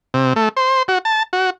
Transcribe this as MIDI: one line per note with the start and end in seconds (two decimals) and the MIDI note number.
0.14 0.33 48
0.36 0.49 57
0.57 0.83 72
0.88 0.98 66
1.05 1.23 81
1.33 1.50 66